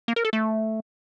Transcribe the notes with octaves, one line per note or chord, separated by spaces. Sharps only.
A#3
A#4
A4
A3